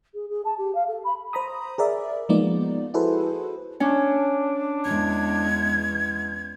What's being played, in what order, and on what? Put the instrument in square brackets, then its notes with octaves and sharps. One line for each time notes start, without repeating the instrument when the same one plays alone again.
[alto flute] G#4
G#4
A5
G4
F5
A4
B5
[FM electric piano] C5 A#5 B5 D#6
G#4 A#4 D5 E5
F3 G#3 A#3 B3 D#4 D5
E4 F#4 G#4 A4 B4 C5
[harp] C#4 [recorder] D4
[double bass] E2 G#3 [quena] G#6